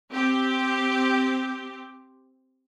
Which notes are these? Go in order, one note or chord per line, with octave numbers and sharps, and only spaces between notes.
C4 G4